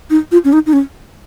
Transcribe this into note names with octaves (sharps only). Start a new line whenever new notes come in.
D#4
F4
C#4
D#4
D#4
C#4